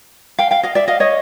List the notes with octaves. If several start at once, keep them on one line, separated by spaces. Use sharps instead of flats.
F5 G5
F5 G5
D#5 F5
D5 E5
D#5 F5
C#5 D#5